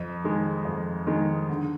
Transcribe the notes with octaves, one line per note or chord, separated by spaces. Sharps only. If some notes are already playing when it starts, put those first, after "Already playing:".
Already playing: F2
D#3 G#3
F2
D#3 G#3
D3